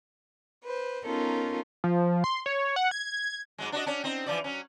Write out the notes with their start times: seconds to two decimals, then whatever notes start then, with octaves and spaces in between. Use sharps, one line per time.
0.64 B4 C5
1.05 B3 C#4 D#4 F4 A4 A#4
1.84 F3
2.24 C6
2.46 C#5
2.76 F#5
2.91 G#6
3.58 G#2 F#3 G#3
3.72 D4 F#4 D#5
3.86 C#4 D4
4.04 C4 D#4
4.26 E3 F3 D5
4.44 F#3 C#4